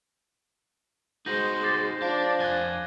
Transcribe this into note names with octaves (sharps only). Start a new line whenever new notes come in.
G#3 D#4 F#4 C5 G6 A#6 F#7
D6 A6 C7
F3 D4 D5 A5
F2 G#5 F#6 G#6 G7